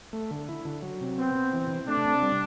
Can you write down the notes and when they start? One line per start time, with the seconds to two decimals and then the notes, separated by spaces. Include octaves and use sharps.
0.13 A3
0.31 D3
0.49 E4
0.65 D3
0.82 F#3
1.01 C3
1.18 B3 C4
1.35 C3
1.53 E3
1.70 C3
1.87 A3 D4
2.05 C3
2.22 G3